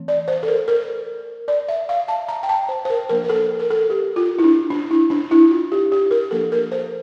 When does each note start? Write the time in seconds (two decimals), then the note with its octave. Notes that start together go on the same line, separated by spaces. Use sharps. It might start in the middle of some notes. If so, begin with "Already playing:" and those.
Already playing: E3 A3 C4
0.08 D5
0.28 C5
0.43 A4
0.48 A#4
0.68 A#4
1.48 D5
1.68 E5
1.89 F5
2.08 A5
2.28 A#5
2.43 G5
2.49 A5
2.69 C5
2.85 C5
2.90 A#4
3.09 F3 A#3 D4 A#4
3.24 A#4
3.29 A4
3.59 A#4
3.70 A4
3.90 G4
4.16 F4
4.39 E4
4.44 D4
4.70 D4
4.91 E4
5.10 D4
5.31 E4
5.51 F4
5.72 G4
5.92 G4
6.11 A#4
6.31 F3 A#3 D4 A4
6.52 A#4
6.72 C5